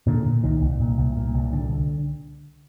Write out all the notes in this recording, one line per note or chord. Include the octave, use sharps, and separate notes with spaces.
A#2 D3
A#2
C2 D#3
C2
A#2
C2
A#2
C2
D3